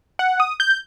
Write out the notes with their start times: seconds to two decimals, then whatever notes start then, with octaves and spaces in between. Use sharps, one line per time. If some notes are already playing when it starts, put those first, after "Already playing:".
0.19 F#5
0.40 D#6
0.60 G6